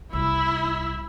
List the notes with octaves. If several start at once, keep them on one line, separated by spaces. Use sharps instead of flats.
C2 E4 E6